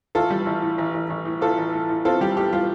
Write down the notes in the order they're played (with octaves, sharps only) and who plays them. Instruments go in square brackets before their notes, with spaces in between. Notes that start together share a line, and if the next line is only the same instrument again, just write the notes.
[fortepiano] A1 F4 A4
G3
A1
A2
A1
A1
A1
A2
A2 F4 A4
A1
A2
A2
C4 F4 A4
G3 G4
A2 G4
G3 F4